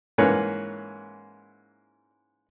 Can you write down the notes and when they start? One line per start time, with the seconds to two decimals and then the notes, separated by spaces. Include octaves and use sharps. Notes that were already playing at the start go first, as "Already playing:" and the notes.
0.18 G#2 E3 A#3 C#4 B4 C#5